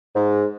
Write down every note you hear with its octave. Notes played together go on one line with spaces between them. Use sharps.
G#2